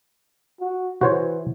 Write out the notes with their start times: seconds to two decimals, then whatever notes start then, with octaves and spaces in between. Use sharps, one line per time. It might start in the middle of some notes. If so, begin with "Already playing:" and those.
0.60 F#4
1.01 E3 F#4 C5 C#5